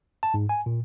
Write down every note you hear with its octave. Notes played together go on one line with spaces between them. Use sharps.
A5
G#2
G#5
A#2